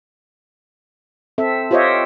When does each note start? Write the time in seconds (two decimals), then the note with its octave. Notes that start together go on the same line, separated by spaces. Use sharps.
1.38 C4 A4 E5
1.71 F4 G4 C5 C#5 D#5 E5